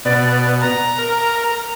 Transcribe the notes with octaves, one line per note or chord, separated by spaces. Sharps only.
B2 D5
A#5
A#4